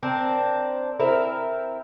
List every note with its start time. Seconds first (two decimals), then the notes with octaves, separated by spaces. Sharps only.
0.03 C4 D4 A#4
1.00 C4 E4 A#4